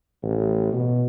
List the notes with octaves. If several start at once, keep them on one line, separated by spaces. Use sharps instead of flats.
A1
B2